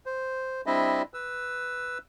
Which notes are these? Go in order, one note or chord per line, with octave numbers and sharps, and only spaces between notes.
C5
G3 C4 D4 E4 D#5 E5
B4 E6